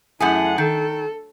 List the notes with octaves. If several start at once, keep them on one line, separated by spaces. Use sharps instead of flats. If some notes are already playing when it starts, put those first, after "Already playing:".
F#2 A3 E4 G#4 F#5
D#3 A4